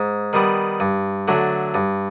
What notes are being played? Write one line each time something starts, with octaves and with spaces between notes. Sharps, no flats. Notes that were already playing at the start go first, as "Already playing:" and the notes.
Already playing: G#2
D#3 G3 B3
G2
D3 F#3 A3
G2